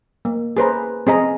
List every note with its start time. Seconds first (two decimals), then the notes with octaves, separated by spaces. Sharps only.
0.25 A#3
0.57 G#4 B4 C5 A#5
1.07 C4 G#4 D#5 A#5